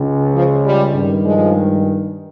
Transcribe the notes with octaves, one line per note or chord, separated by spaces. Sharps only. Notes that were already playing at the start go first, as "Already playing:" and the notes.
Already playing: C#2 C#3
F3
G3
G2 D#3
F3 G#3